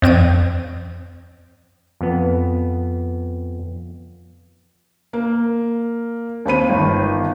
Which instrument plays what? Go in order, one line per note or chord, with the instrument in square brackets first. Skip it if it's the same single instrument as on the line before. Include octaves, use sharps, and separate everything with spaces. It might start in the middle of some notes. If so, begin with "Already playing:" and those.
[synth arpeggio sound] F2 C4 D7 D#7
[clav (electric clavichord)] F2 B3
[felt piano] A#3
D#2 C4 B5 D#7
G1 D#3